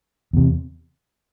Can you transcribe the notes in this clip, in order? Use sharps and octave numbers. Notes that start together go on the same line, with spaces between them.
E2 C3